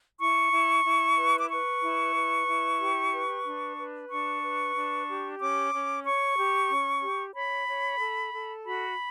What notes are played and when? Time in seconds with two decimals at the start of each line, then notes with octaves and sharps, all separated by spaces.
0.19 E4 C#6
0.52 E4
0.85 E4
1.17 B4
1.39 D6
1.50 B4 C#6
1.82 E4
2.15 B4
2.47 E4
2.80 G4
3.12 B4
3.45 D4
3.77 B4
4.10 D4 C#6
4.42 B4
4.75 D4
5.07 G4
5.40 C#4 D6
5.73 C#4
6.05 C#5 C#6
6.38 G4
6.70 C#4
7.03 G4
7.35 C#5 B5
7.68 C#5
8.00 A4
8.33 A4
8.66 F#4 B5